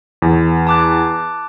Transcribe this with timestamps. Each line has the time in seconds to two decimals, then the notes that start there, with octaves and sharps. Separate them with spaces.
0.22 E2
0.67 A5 D6 F#6